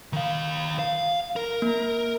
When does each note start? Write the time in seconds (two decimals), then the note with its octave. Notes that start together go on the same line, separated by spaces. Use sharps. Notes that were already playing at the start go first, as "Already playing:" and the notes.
0.13 D#3 F5
0.79 F5
1.36 A#4
1.62 A#3